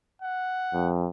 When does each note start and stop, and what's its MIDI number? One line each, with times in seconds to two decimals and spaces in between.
0.22 0.92 78
0.74 1.08 41